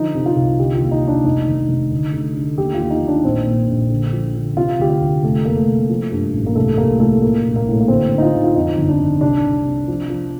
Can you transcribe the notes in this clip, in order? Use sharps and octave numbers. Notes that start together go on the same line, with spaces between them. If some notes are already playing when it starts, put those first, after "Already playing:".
Already playing: D3 F3 D#4
C3
F4
C2
D3 G4
F4
D#2
D#4
D#2 D4
F1 D#4
D#3
F1
D2
D3
D3
D#2 G4
F4
D#2
D#4
D#2
D4
A#1 C4
A#2
A#1
D3
F3
D3
C3 F4
D2 G4
F4
D2
F1 A3
F2 A#3
A3
F1
F3
G2
A1
A#3
C2 A3
C2 A#3
F3 A3
A2 A#3
A#1
A#3
A2
A3
A#3
D2 C4
D3
D#4
F4
D2
F4
F2 D#4
G1
D4
D#3
C2 D4
C2
C3
F3
F3